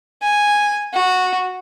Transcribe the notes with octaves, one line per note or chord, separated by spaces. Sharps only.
G#5
F#4